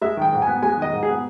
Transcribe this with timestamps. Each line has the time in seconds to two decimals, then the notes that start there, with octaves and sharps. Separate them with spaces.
0.02 G#3 E5
0.17 D#3 G5
0.33 G#2
0.42 B3 G#5
0.63 G#3 G#5
0.78 D#3 D#5
0.93 G#2
1.03 G#4
1.09 B3